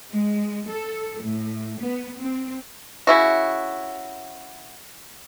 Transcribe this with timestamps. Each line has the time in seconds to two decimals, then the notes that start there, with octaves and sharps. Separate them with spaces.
0.11 G#3
0.68 A4
1.22 A2
1.81 B3
2.19 C4
3.07 C#3 E4 F#4